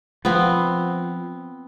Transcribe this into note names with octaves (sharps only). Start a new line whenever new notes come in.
F3 B3 C4